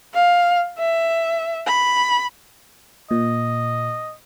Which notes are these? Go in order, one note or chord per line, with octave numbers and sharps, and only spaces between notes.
F5
E5
B5
A#2 D#5